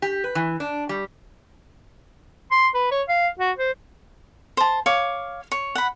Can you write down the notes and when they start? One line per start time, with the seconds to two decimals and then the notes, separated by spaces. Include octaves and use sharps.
0.02 G4
0.24 B4
0.35 E3
0.60 D4
0.89 G3
2.52 C6
2.75 B4
2.92 C#5
3.09 F5
3.40 F#4
3.58 C5
4.57 C5 A5
4.86 C#5 F5 D6
5.52 C#5
5.75 F#5 B5